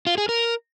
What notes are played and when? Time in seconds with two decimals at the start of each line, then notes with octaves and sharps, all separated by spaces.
0.07 F4
0.18 G#4
0.29 A#4